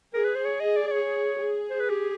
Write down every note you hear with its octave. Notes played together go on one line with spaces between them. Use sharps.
G#4 A#4
B4
C5
C#5
D#5
D5
D5
C#5
G#4
C5
B4
G4